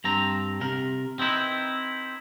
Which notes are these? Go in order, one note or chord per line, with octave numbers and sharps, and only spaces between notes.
G2 C4 A#5
C3 A#4
C4 D#4 E4 B4